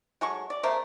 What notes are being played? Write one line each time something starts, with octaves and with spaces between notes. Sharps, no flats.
F#3 G#3 A3 C#6
D5
C#3 A3 A#4 C5